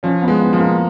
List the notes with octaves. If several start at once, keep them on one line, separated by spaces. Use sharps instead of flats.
F3 C#4
B3
G#3
B3
F3
A#3